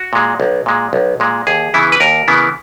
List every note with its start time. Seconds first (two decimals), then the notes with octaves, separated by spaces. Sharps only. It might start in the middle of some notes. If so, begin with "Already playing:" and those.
Already playing: F#4
0.13 A#2 G#3
0.40 B1
0.66 A#2 G#3
0.93 B1
1.20 A#2 G#3
1.47 D#2 G#4
1.74 C#3 E3 B3 E4
1.92 B4
2.00 D#2 A#4
2.28 C#3 E3 B3 E4